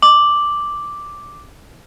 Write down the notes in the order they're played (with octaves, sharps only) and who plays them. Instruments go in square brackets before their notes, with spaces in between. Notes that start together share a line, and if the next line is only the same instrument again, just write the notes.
[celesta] D6 F#7